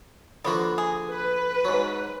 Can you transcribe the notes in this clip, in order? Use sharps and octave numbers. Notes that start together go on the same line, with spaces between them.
D3 F3 A#3 B3 F#4
G#4
B4
G#2 F#3